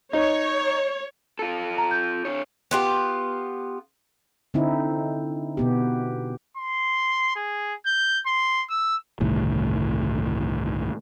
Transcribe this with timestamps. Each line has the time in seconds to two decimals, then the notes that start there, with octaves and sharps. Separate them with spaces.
0.13 D#4 C#5
1.39 F4 A4
1.78 A#5
1.91 G6
2.25 D3 C#5
2.71 B3 F4 G4
4.54 D3 C4 D#4 E4
5.57 B2 B3 G4
6.57 C6
7.36 G#4
7.86 G6
8.26 C6
8.69 E6
9.20 G1 C2 A2 D#3